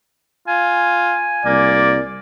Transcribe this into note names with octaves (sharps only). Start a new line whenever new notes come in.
F4 G#5
C2 A#3 D5